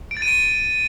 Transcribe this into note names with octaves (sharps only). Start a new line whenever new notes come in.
D7
A6
D#7
D7